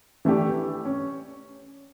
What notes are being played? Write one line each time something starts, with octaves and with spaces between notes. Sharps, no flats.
E3 A3 D4 G4
C#4